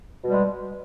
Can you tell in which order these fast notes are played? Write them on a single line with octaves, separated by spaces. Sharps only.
B2 G3 G#3